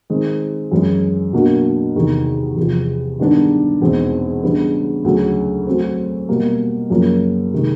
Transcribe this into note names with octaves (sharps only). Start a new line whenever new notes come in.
D#3 G#3 C4
F#2 C#3 E3 G#3
B2 F#3 A#3 D4 F#4
E2 C3 D#3
E2 C3 F3
G2 D#3 G#3 B3 D4
E2 B2 G#3 C4 D#4
C#3 E3 G3 B3 D4
D2 C#3 F#3
F#3 A3 C4
B2 G3 A#3
F#2 C#3 F3 A#3
C3 D#3 G#3